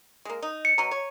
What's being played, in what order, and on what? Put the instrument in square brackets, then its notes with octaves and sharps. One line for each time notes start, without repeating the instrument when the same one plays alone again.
[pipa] G#3 A#3
D#4
[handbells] C#7
[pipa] B2 F#3 [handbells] A#5
[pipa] C#5